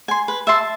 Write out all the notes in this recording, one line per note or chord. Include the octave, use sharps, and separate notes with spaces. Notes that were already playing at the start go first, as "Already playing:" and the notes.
G#5 C6
B4
E5 A5 C6